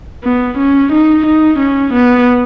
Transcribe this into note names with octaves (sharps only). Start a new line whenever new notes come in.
B3
C#4
D#4
D#4
C#4
B3